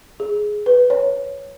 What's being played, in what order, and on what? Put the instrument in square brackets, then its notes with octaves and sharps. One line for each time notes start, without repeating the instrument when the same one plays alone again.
[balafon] G#4
B4
C#5